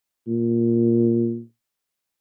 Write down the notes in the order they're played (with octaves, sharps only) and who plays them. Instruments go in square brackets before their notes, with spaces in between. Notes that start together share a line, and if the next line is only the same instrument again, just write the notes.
[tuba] A#2